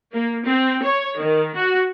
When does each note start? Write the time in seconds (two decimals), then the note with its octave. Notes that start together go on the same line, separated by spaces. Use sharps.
0.14 A#3
0.47 C4
0.85 C#5
1.22 D#3
1.56 F#4